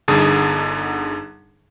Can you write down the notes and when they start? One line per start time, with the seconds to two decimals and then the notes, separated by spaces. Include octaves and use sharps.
0.08 G1 D3 D#4 G#4 A5 D#6